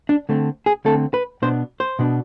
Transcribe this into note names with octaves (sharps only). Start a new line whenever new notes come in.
D4
D3 A3 C4
G#4
D3 A3 C4 A4
B4
B2 B3 D4 C5
C5
B2 B3 D4